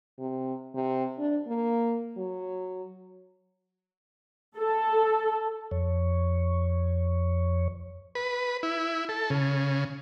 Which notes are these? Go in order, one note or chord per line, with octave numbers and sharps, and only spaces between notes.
C3
C3
D4
A#3
F#3
A4
F2 C#5
B4
E4
A4
C#3